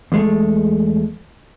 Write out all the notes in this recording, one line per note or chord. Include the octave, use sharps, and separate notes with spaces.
E2 G#3 A3